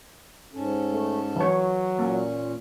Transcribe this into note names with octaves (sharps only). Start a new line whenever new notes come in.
G#2 C#4 A4
A3
E3 F#3 C#5
A#2 A#3 C#4